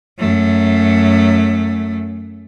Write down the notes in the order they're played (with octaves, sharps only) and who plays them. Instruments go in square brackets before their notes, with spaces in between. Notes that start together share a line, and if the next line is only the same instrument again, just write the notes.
[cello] F#2 A3